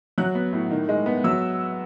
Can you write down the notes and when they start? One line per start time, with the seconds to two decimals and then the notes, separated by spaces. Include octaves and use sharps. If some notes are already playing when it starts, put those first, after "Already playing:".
0.18 F#3 F#6
0.35 B3
0.53 A2
0.71 D#3
0.89 G#3
1.06 B3
1.24 F#3 E6